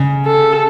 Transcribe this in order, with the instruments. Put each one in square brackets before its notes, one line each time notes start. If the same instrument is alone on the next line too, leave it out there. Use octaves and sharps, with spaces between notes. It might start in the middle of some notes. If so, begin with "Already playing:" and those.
Already playing: [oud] C#3
[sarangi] A4